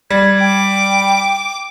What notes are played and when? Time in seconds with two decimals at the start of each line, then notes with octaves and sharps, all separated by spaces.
0.10 G3 G#6
0.40 G5 D6